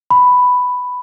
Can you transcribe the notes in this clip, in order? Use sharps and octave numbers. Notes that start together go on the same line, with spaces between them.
B5